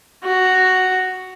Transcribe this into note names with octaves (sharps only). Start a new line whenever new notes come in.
F#4